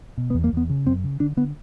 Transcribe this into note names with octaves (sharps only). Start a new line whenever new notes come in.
B2
B3
E2
A#3
E2 B3
C#3
F#2 C4
C#3
D3 D4
D3 B3